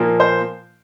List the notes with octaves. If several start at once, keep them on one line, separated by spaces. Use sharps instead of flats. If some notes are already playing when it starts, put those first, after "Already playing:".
Already playing: A#2 F3 A#3
C5